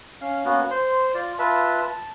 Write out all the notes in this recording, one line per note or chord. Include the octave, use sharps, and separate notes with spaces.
C#4 F5
A#3 B3 C#4 F#4
C5 C6
F4 D5
F4 B4 E5 A5
A5